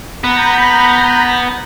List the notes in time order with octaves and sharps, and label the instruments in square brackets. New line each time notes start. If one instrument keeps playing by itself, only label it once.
[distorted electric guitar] B3 [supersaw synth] A#5 B5 G6